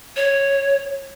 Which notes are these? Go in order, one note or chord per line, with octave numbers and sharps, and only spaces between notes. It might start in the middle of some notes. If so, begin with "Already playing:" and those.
C#5